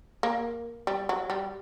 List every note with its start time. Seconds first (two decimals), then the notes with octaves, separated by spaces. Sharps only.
0.23 A#3
0.87 G3
1.09 F#3
1.30 G3